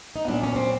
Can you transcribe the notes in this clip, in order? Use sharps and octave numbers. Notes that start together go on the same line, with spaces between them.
D#4
A#2 F#3 B3 D4
C#4
C4